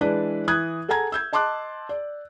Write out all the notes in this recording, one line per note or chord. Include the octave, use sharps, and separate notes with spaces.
E3 G#3 D4 E4 B4 D5
E3 D#6 F#6 G#6
G#4 A4 F#5 G#5 A#5 G#6
E6 G6 G#6
D#5 A5 C6 D6 F#6
D5